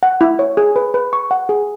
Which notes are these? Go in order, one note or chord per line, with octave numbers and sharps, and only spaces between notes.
F#5
E4
C#5
G#4
B4
B4
C#6
F#5
G#4